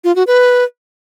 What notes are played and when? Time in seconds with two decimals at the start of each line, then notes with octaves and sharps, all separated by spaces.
0.04 F4
0.16 F#4
0.27 B4